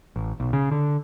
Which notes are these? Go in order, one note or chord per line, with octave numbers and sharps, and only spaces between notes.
A1
B1
C#3
D3